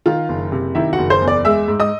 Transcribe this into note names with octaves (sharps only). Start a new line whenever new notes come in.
D#3 F4 F5
F#1
C3
D#3 E4 E5
F#4 F#5
F#1
C5 C6
E2
D5 D6
G#3 E5 E6
G#2
D#5 D#6